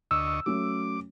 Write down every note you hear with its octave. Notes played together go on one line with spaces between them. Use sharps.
D2 D#5 C#6 E6
F#3 A3 C#4 D6